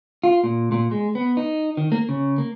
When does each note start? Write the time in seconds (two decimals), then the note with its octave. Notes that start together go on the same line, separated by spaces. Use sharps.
0.24 F4
0.44 A#2
0.72 A#2
0.91 G#3
1.15 B3
1.37 D#4
1.77 D#3
1.92 A#3
2.09 C#3
2.38 A#3